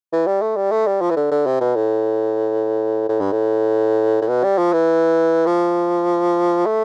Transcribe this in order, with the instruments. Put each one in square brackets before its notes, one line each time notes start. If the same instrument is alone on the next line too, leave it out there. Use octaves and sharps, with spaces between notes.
[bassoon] E3
G3
A3
G3
A3
G3
F3
E3
D3
D3
C3
B2
A2
A2
G2
A2
A2
B2
G3
F3
E3
F3
A3